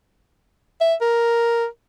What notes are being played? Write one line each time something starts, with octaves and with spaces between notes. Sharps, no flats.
E5
A#4